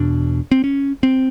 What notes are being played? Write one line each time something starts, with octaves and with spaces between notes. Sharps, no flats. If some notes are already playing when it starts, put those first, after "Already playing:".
Already playing: E2 B2 D4
C4
C#4
C4